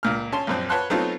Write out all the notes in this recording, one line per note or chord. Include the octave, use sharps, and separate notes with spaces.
C#2 A#2 F6
C#4 A5 C6
A#1 F#2 C4
B4 C#5 F#5 A5 C6 F#6
F#3 A3 B3 C4 D#4 F4